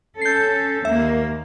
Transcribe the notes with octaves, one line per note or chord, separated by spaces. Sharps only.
C#4 A4 G6 C7
D#2 A#3 E5